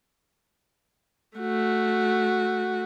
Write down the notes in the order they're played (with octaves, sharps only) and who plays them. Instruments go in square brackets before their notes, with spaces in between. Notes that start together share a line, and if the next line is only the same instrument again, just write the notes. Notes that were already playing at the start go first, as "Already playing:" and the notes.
[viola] A3 F#4